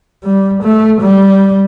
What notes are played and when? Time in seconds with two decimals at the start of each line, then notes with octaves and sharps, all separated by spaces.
0.24 G3
0.63 A3
1.01 G3